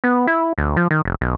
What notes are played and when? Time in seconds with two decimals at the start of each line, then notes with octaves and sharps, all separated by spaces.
0.04 B3
0.27 E4
0.58 D2
0.77 F3
0.91 D#3
1.05 F1
1.21 B1